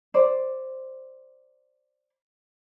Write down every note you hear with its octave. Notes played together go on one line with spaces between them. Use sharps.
C5 D5